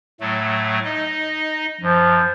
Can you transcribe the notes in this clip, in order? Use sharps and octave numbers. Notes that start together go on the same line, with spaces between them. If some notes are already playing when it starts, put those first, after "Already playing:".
A2 F#3 A3
D#4 D#5
F#2 F3